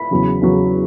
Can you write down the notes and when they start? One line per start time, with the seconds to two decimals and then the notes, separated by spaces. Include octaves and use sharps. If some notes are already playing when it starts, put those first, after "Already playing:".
Already playing: B5
0.11 E2 C#3 F#3
0.41 E2 C#3 F#3